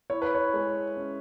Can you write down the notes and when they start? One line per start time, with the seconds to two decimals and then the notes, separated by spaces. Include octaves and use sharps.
0.10 E4 C#5
0.22 B4
0.35 C#5
0.54 G#3
0.97 C#4